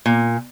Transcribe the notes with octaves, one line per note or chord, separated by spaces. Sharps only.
A#2